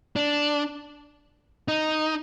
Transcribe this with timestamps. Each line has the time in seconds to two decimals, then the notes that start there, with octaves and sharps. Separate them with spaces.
0.16 D4
1.68 D#4